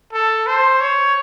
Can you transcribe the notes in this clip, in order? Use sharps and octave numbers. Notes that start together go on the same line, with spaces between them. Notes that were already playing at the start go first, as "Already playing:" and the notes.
A4
C5
C#5